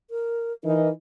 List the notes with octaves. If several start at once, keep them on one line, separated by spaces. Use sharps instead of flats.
A#4
E3 D#4 A#4